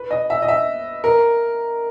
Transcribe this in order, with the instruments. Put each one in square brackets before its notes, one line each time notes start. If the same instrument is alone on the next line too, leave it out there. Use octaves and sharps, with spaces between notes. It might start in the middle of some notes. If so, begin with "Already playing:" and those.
Already playing: [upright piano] B4
D#5
E5
D#5
E5
A#4